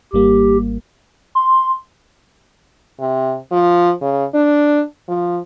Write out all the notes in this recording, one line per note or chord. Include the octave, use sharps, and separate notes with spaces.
G#1 G3 A#3 G4
C6
C3
F3
C#3
D4
F3